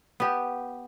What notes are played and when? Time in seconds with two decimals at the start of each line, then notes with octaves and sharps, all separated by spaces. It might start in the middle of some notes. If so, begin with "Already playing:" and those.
0.20 B3 G4